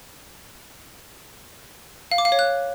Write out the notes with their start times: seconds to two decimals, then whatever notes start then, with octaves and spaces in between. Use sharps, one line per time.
2.11 F5
2.18 D6
2.25 F5
2.32 C#5
2.39 F#6